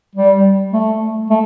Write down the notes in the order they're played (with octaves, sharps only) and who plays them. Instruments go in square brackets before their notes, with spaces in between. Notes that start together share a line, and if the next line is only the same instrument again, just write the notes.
[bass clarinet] G3
A3
A3